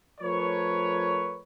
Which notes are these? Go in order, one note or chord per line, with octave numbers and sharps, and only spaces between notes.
F3 A3 A#4 B4 C#5